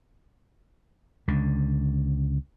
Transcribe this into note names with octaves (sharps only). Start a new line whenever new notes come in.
C#2 D3